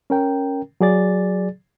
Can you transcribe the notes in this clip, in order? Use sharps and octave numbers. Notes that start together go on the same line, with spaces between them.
C#4 A#4 G5
F#3 G#4 D5 A6